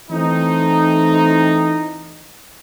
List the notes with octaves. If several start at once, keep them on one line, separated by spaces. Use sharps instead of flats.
E3 A3 C4 D#4